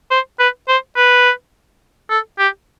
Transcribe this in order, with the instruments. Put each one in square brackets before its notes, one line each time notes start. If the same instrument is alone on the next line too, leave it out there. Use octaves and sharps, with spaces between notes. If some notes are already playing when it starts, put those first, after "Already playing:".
[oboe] C5
B4
C5
B4
A4
G4